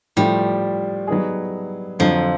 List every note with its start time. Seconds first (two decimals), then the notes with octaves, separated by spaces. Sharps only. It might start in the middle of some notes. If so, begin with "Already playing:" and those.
0.17 A2 F3 G3 A3
1.07 F#3 B3 D#4 G#4
1.99 F2 D3 F3 F#3